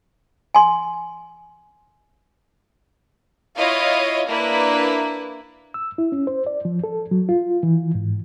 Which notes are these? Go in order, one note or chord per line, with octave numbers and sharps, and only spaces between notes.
G#5 C6
E4 F4 C#5 D#5 F5
A#3 D4 E4 B4
E6
E4
C#4
C5
D5
F3
A4
F#3
F4
E3
G#2